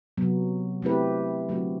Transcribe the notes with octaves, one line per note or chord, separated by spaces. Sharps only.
C3 F#3 B3
A3 C4 E4 G4 B4
D3 F#3 A3 C4 F#4